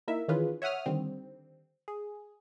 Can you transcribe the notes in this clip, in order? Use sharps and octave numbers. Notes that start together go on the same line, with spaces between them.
A#3 D#4 E4 A#4 E5
D#3 E3 C#4 F4 G#4 B4
C#5 E5 F#5 D#6 F6
D3 D#3 G3 C4
G#4